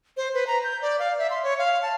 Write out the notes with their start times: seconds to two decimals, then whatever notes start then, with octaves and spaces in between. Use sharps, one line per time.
0.17 C5
0.34 B4
0.47 A#5
0.64 G6
0.82 D5
0.99 F5
1.19 E5
1.30 C6
1.43 C#5
1.59 F5
1.82 A5